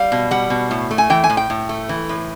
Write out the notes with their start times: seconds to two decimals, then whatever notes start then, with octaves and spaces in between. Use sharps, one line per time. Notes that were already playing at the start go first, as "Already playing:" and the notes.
Already playing: G3 F5
0.12 B2
0.31 G3 F#5
0.50 B2
0.71 A2
0.91 A3
0.98 G#5
1.10 E3 G5
1.24 G#5
1.30 A2
1.37 G5
1.50 A2
1.69 A3
1.89 E3
2.09 A2